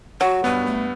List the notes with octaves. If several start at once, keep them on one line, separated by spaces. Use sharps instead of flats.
F#3 F#4
G2 B3 B4
A3